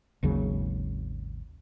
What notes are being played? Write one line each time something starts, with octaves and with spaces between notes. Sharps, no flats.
G#1 D#2 C#3 F#3